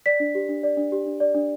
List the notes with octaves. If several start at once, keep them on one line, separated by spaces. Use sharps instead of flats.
D5 B6
D4
G4
D4
D5
D4
G4
D4
D5
D4